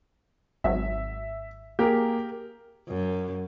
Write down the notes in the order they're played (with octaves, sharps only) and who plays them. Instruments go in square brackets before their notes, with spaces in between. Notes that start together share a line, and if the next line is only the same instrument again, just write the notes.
[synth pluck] G#1 F#3 [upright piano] E5
[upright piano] A#3 G#4 [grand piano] G4 A#4
[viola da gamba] F#2